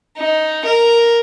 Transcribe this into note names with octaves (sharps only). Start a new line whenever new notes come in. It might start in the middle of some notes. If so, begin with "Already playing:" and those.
D#4
A#4